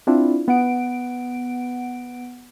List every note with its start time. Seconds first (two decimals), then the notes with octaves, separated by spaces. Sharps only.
0.07 C4 D4 E4 F4
0.48 B3 F#5 D7